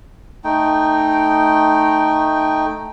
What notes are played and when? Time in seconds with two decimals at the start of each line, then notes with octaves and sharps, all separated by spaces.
0.44 A3 D#4 G5